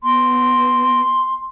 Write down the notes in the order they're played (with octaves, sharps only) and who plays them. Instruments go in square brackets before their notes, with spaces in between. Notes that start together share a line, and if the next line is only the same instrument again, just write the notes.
[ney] B3 [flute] C6